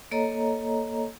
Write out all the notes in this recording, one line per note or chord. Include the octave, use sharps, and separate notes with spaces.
A#3 A4 C#5 D#5 A#5